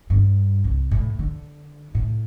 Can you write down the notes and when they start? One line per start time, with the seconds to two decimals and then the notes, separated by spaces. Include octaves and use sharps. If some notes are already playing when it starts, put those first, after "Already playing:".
0.10 G2
0.64 C2
0.91 A2
1.19 D3
1.95 A2